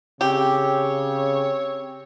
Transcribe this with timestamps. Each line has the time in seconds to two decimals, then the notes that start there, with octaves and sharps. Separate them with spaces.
0.21 C#3 C4 G4 C#5